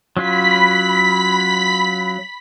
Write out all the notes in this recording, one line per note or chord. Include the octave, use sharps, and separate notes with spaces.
F#3 C#4 F4 B5 B6